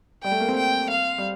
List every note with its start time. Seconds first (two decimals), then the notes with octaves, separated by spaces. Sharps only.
0.23 G3 G5
0.32 A3
0.40 A#3
0.49 C4
0.57 G5
0.90 F5
1.18 G3